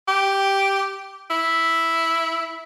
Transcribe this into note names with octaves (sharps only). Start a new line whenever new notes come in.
G4
E4